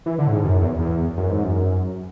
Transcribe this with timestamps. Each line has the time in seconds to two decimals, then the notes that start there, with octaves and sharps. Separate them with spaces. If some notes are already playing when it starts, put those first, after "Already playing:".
0.06 E3
0.18 D3
0.27 A2
0.31 G#2
0.44 F#2
0.62 E2
0.78 E2
1.17 F#2
1.29 G#2
1.43 F#2